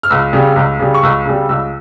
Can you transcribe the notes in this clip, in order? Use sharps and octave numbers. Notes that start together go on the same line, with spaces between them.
F6
C#2 E6
C#3 G3
C#2
C#3 G3
C#6
C#2 E6
C#3 G3
C#2 E6